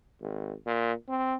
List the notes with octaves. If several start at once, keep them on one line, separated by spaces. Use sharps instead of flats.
G#1
A#2
C4